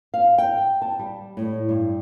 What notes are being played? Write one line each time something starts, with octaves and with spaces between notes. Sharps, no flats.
F5
G5
A5
G3
A2
G2